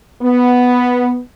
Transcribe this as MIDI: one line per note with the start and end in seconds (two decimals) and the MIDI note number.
0.22 1.18 59